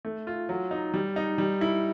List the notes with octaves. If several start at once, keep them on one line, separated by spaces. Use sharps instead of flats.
A3
F4
F#3
D#4
G3
D#4
G3
E4